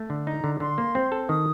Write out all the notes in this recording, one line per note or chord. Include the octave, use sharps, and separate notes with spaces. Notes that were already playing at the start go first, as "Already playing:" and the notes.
Already playing: A3
D3
D#4 A#5
D3
D3 C6
A#3
C4
A4
D#3 D#6